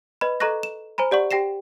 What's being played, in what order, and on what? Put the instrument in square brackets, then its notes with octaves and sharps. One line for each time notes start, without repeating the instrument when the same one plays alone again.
[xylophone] B4 D#5 B5
A4 D#5 A#5 C#6 F#6 A#6
E7
C5 G#5 A#5 B5
G4 D5 F#5 C#6
G4 G5 A#6 C7 E7